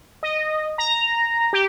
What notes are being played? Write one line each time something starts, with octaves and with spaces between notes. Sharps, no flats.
D#5
A#5
G4